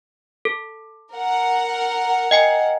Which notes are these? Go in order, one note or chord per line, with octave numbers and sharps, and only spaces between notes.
A4
A#4 F#5
D#5 G5 G#5